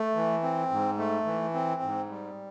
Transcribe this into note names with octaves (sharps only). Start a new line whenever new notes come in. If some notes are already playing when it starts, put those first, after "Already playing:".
Already playing: A3
E3
C4
G#2
A3
E3
C4
G#2
G3